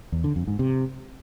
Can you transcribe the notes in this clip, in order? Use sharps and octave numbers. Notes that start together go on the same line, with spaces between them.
E2
D3
F2
G#2
C3